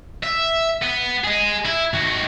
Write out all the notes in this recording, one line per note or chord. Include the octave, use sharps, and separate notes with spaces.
E5
B3
G#4 D#5
E4
D#3 F#4